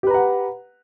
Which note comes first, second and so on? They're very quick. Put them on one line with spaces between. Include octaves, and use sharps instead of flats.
G4 B4 A#5 F#5